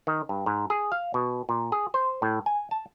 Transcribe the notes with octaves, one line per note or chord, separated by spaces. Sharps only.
D#3
G2
G#2
G#4
F5
B2
A#2
G#4
C5
A2
G#5
A5